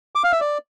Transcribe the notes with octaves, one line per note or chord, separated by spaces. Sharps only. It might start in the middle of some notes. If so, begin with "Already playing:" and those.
D6
F5
E5
D5